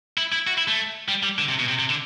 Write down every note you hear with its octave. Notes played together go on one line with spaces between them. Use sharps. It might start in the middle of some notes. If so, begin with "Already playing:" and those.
E4
E4
F#4
E4
A3
G3
G3
D3
C3
B2
C3
C3
D3